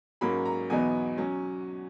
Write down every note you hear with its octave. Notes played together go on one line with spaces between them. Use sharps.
G#2 F#3 A#3 C#4 B5
A#5
E2 B2 F#3 B3 D#4 G#5
F#3 C#4